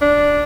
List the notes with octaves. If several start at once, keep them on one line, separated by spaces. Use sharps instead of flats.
D4